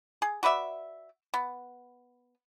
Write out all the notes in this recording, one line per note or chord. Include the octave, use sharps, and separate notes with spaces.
G#4
F#4 B4 D5 E5
B3